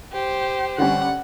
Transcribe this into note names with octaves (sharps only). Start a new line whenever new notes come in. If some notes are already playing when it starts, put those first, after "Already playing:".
G4 C5
D3 G3 C#4 F#5